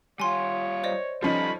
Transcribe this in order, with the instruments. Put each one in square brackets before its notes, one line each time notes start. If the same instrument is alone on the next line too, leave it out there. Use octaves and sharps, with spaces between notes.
[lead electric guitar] G3 F4 [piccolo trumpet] C#5 [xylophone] G#5 C6
[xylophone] C5 D5 D#5
[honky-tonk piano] F3 C#4 D#4 [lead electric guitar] G3 A4 [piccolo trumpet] B5